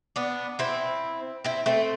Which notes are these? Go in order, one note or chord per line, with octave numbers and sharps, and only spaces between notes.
B3 D4
C4 E4
C4 E4
A3 C4